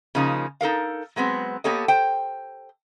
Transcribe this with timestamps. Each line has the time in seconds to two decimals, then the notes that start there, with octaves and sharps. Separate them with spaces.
0.15 C#3 F3 A#3 D#4
0.61 D#4 A4 A#4 F5
1.16 F#3 G#3 B3 C4
1.64 A#3 B3 G4 A4 C#5 D#5
1.88 C5 G5